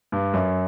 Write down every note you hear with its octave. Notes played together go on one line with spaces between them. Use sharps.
G2
F#2